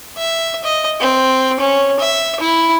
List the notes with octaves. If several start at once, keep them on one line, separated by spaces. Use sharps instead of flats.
E5
D#5
C4
C#4
E5
E4